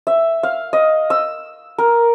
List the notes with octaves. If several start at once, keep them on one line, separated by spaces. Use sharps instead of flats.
E5
F5
D#5
E6
A#4